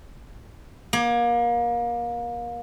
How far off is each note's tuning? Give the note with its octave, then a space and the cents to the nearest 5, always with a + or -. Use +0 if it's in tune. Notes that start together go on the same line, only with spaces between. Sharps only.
A#3 +30